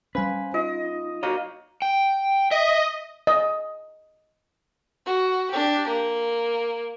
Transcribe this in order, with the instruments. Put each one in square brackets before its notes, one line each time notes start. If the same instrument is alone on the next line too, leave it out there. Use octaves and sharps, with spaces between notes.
[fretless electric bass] G3 C#4 [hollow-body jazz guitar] B4 [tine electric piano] C5 F5 G#5
[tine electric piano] D#4 F4 [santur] D#5
[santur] A#3 [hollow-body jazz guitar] F#4 C#5 D#5
[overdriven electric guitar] G5
[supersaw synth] D#5 [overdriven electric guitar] E5
[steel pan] D#5
[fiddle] F#4
D4 G4
A#3